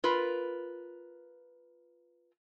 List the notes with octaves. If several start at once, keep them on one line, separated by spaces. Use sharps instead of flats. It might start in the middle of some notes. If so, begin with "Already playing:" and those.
F4 A#4 B4